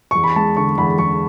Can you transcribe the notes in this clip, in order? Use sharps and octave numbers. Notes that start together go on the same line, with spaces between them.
E2 C#6
B5
G#3 A5
D3 C#6
E2 B5
E2 C#6